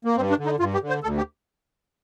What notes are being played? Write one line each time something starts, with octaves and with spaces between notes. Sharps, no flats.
A#3
G2 C4
D4
D3
D#4
G2 F4
G4
D3
C5
D2 A4
G4